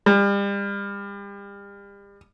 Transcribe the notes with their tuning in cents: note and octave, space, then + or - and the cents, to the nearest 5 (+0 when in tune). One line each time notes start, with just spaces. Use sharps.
G3 +35